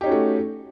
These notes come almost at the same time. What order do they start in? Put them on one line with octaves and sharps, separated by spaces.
G4 D#4 C#4 F#4 A3